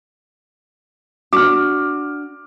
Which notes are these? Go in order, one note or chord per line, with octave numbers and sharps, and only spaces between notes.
D4 F#4 D6 F6